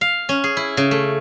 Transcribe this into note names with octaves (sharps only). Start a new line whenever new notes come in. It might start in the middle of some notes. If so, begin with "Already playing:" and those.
F5
C#4
G#4
E4
C#3
A3